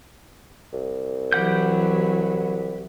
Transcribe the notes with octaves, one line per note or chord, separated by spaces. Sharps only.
C2
E3 F#3 G4 F#5 G6